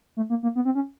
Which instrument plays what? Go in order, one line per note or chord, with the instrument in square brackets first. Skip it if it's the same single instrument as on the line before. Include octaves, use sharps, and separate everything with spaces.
[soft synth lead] A3
A#3
A#3
B3
C4
C#4